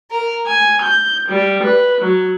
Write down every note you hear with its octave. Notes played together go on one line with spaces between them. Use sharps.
A#4
G#5
G6
G3
B4
F#3